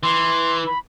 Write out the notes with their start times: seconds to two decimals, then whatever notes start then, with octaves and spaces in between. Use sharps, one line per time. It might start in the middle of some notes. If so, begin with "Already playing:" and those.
0.03 E3 C6
0.66 B5